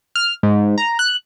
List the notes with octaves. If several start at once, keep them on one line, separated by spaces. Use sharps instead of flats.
F6
G#2
A#5
F#6